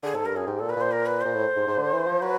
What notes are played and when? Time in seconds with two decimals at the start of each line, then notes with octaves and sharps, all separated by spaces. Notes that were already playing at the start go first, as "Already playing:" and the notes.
0.03 D3 G#4
0.14 G#2 A4
0.25 G2 A#4
0.36 F#2 G#4
0.47 G#2 G4
0.58 A#2 A4
0.69 B4
0.76 A#2 C5
0.91 A#4
1.05 B4
1.20 C5
1.25 A#2
1.34 A2
1.56 G#2
1.67 G#2
1.78 D3
1.93 E3
2.07 F3
2.22 F#3 B4